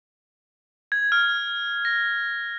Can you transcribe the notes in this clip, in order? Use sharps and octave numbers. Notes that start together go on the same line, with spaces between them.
G#6
F6
A#6